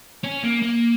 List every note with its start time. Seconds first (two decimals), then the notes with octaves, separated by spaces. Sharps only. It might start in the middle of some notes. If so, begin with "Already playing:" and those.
0.24 C#4
0.44 A#3
0.63 A#3